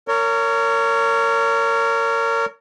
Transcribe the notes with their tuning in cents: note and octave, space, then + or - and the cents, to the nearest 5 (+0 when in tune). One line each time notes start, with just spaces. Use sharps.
A#4 -25 C#5 +15